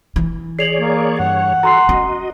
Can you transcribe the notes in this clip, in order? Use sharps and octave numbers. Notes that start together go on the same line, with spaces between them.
E3
G#4 C#5 D5 C7 F7 F#7
A#3
G2 C#5 F#5
F#4 A4 A#5 C6 C7
C#4 F#4 D#5